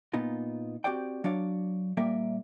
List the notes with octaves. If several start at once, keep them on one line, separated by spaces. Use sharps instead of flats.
A#2 B3 D#4 F4
C4 F#4 G4 C5 D5 G5
F#3 D4 C#5 D5 F5
A#2 G3 A#3 A#4 D5 E5